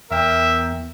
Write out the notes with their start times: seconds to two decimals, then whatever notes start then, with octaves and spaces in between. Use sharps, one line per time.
0.11 E2 A#4 E5 G5